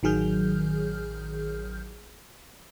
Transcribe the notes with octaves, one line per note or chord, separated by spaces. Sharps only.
A1 D#3 F#3 G#4 F6 G6